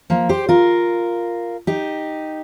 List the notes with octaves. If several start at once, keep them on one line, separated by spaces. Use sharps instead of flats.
F3 A#3
G4 C5
F4 A#4
D#4 G4